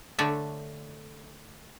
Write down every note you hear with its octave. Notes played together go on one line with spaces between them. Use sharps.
D3 A3 C#5 D5 E5